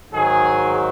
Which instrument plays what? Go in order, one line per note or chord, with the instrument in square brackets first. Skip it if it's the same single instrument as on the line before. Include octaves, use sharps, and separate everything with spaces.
[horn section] G#2 D#3 F#3 G#4